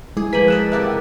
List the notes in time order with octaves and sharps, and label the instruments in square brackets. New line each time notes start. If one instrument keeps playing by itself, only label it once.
[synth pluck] G#3 [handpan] E4 [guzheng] G#4
[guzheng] F3 A#3 [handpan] G#4 [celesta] B4 D#7 F#7 [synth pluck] B6
[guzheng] A4 A#4 D#5 [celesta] F#6 E7
[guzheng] C3 A#3 G4 [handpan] E5 [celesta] F#6
[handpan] C#3 F#5 [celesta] G5